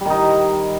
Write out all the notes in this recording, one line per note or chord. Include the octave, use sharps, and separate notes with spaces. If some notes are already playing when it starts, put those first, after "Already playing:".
D#3 G3 D#4